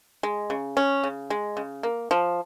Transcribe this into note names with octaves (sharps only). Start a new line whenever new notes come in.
G#3
C#3
C#4
C#3
G#3
C#3
A#3
F3